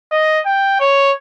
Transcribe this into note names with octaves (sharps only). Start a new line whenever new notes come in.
D#5
G5
C#5